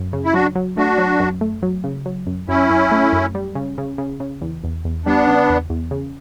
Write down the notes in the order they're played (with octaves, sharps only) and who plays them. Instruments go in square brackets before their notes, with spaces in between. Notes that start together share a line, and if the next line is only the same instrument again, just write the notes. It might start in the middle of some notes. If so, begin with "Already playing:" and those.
Already playing: [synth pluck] F#2
C#3
[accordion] E4
[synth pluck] F#3 [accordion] D4 F#4
[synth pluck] F#3
[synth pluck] A3 [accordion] D4 F#4
[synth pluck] F#3
F#2
A3
F#3
C#3
F#3
F#2
[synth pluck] F#2 [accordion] C#4 E4
[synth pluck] F#2
A3
F#2
G3
C#3
C#3
C#3
C#3
E2
E2
E2
[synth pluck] G3 [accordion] B3 D4
[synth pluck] C#3
E2
E2
C#3